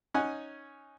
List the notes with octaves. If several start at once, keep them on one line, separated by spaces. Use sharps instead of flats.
C#4 D#4 F#5 G#5